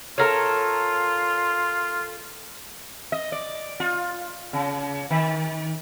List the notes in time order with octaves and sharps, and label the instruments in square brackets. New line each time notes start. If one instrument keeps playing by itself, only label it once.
[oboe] F4 [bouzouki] A4 A#4 C#5
[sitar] D#5
D5
F4
C#3
D#3